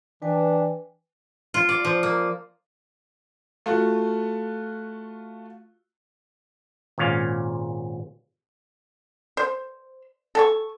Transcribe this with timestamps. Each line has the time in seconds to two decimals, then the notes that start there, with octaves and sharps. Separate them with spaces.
0.22 E3 D4 B4 G5 G#5
1.54 F4
1.69 D5
1.85 F3
2.03 A#3
3.66 A3 F4 F#4
6.98 G#1 A#2 C#4 F5
9.37 C5
10.35 A4 G#5 C#6